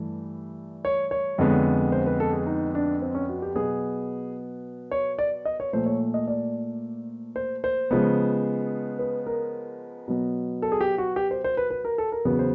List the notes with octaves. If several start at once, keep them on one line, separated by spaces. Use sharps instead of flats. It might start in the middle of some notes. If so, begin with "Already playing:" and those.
Already playing: G2 E3 A3
C#5
C#5
F2 D3 F3 G#3 B3
C5
B4
A4
G#4
D#4
D4
C4
C#4
F#4
G4
B2 F#3 B3 G#4
C#5
D5
D#5
C#5
A#2 F3 A3 C5
C#5
D#5
D5
C5
C5
C#3 F3 G#3 B3
B4
A#4
B2 F#3 B3
A4
G#4
G4
F#4
G4
C5
C5
B4
B4
A#4
A4
A#4
E2 C#3 F#3 B3 B4
C5